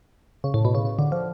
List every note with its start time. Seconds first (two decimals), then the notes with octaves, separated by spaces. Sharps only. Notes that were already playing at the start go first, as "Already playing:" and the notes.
0.44 C#3
0.54 A2
0.65 B2
0.75 C#3
0.85 C#3
0.99 D3
1.12 F3